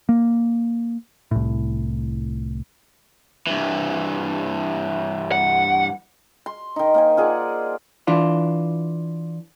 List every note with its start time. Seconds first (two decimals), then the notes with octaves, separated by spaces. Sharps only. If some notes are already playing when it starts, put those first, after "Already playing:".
0.09 A#3
1.31 C2 A2
3.47 G2 E3
5.32 F#5
6.46 C6
6.76 D#3 D#4
6.94 A#3 C5 G#5
7.17 F4 G#4 D5 F#5
8.07 E3 D4 F4